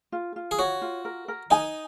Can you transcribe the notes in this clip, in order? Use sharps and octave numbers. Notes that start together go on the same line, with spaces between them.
F4
F4
G#4
F#4 C#5
F4
A#4
A#4
D#4 G#5